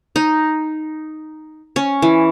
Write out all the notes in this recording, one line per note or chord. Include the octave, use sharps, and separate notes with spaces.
D#4
C#4
E3